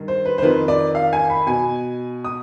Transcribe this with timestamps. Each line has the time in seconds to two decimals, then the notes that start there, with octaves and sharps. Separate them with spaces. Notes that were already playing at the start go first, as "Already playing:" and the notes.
Already playing: G2 D#3
0.08 C5
0.25 B4
0.38 C5
0.42 F2 D#3 B4
0.68 D5
0.95 F5
1.13 G#5
1.29 B5
1.47 B2 G#5
2.24 D#6